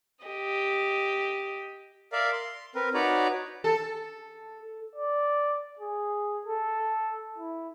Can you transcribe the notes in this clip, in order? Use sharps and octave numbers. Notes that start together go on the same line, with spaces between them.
G4 D#5
A#4 D5 E5 F5
C6
C4 A#4 B4
D#4 F#4 B4 C#5 D5 A#5
A4
D5
G#4
A4
E4